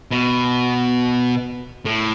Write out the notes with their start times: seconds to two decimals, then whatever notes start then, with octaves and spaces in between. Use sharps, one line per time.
0.11 B2
1.85 A2